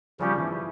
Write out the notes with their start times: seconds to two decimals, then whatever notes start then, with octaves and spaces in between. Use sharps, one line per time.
0.19 C#3 F3 G3 C#4 G4
0.38 E3